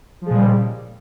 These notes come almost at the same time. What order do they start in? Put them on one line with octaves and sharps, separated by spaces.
F3 G#3 A#2 G3 C#3